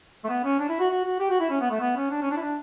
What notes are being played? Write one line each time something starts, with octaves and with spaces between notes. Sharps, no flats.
A3
B3
C#4
D4
E4
F#4
F#4
F#4
G4
F#4
E4
C#4
B3
A3
B3
C#4
D4
C#4
D4
E4
D4